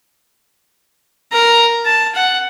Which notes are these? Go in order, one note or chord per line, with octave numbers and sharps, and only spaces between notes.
A#4 A#5
A5
F#5